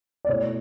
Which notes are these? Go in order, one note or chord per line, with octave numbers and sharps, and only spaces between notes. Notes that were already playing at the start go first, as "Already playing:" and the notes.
D5
B2 A3 E4 C#5